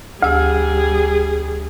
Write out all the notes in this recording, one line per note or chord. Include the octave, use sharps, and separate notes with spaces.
D2 G3 G#4 E6